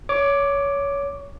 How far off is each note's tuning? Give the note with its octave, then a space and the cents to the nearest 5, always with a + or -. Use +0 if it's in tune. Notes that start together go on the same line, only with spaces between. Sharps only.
C#5 +20 D6 +0